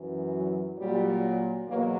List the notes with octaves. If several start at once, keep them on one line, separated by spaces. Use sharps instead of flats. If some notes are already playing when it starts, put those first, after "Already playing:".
Already playing: F#2 E3
F#3
A#2 F#3 G3
E2 B2 F#3 A#3